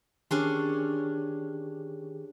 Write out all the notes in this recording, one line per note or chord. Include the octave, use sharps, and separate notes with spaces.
D#3 C#4 D4 G4 G#4 C6